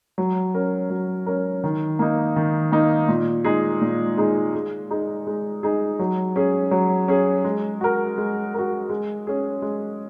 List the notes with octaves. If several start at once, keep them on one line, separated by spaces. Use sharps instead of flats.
F#3
C#4 A#4
F#3
C#4 A#4
D#3
A#3 D#4
D#3
A#3 D#4
A#2
G#3 D#4 G#4
A#2
G#3 D#4 G#4
G#3
D#4 G#4
G#3
D#4 G#4
F#3
C#4 G#4
F#3
C#4 G#4
G#3
F#4 A#4
G#3
F#4 A#4
G#3
C#4 G#4
G#3